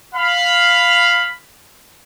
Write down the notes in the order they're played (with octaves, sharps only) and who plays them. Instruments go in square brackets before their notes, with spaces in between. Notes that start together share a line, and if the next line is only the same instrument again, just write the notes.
[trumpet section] F5 B5